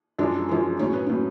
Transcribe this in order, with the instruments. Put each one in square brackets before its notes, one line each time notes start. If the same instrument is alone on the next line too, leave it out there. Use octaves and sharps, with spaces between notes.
[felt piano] F#2 F3 G#3 D4
F#2 F3 G#3
A2 F#3 C#4
B3
A2 F#3 C#4